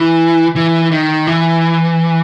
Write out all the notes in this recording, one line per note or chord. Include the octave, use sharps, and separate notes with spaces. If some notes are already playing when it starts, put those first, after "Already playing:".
Already playing: E3
E3
D#3
E3